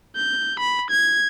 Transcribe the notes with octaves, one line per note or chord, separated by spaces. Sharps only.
G6
B5
G#6